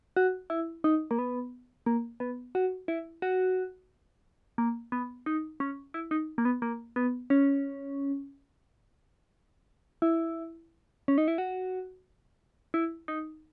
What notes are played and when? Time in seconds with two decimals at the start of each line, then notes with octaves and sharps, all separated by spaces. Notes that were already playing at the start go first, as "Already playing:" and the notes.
0.16 F#4
0.50 E4
0.84 D#4
1.11 A#3
1.19 B3
1.86 A#3
2.20 B3
2.55 F#4
2.88 E4
3.22 F#4
4.58 A#3
4.92 B3
5.26 D#4
5.60 C#4
5.94 E4
6.11 D#4
6.38 A#3
6.45 B3
6.62 A#3
6.96 B3
7.30 C#4
10.02 E4
11.08 C#4
11.18 D#4
11.28 E4
11.38 F#4
12.74 E4
13.08 D#4